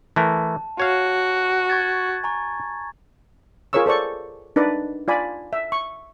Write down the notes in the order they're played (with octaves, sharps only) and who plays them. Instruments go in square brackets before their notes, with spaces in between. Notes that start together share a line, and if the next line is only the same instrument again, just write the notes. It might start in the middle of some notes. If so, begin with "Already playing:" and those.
[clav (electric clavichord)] E3 A3 A#4 [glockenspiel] A5
[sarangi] F#4 [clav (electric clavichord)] C#5 F5
[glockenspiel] C#6 G#6 A6
G#5 A#5 C#6
[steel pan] F4 G#4 A#4 C#5 C#6 E6
A4 C5 D5 C#6
D4 D#4 B4 D5
F4 D5 G#5 B5
E5
C#6